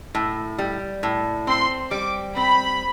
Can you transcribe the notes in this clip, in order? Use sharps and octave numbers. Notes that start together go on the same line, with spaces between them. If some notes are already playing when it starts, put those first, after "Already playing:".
A2
G3
A2
C4 C6
G3 D6
C4 B5